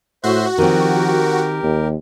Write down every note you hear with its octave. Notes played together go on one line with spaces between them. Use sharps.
A2 F#4 C5 E5 C6
D#3 F3 C4 G4 A#4
D#2